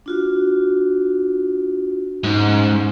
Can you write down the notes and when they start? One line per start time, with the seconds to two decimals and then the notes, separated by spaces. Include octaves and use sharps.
0.06 D4 F4 F#4
2.24 G#2 C#4 D#4